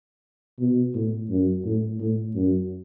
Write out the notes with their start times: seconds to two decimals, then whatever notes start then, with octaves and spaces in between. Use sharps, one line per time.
0.60 B2
0.94 A2
1.30 F#2
1.65 A2
2.00 A2
2.35 F#2